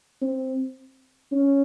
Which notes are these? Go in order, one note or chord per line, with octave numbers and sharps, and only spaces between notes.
C4
C#4